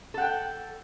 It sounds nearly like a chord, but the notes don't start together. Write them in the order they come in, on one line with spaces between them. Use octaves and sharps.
A4 F#5 G5